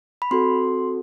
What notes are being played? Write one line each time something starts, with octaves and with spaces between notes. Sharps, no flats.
B5
C4 F#4 A4 C6